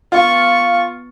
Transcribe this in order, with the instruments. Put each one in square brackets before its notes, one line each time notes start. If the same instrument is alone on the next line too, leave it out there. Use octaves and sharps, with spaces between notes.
[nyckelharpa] B3 C#6 [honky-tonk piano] F4